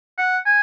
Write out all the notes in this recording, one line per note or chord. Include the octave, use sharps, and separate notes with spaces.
F#5
G#5